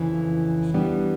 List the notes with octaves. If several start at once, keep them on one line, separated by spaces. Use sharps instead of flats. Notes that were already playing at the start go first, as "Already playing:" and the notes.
Already playing: F2 C#3 E3
E3 G3 B3 D4